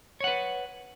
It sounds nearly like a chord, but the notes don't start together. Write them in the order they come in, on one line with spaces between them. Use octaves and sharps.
C#5 F#5 B4